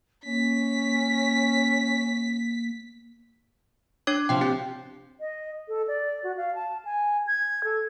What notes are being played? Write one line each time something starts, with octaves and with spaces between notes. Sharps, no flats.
A#3 C#4 B6
D4 C#5 D6
C3 F3 G5
C4 G4
D#5
A4
D5
F#4
F5
A5
G#5
G#6
A4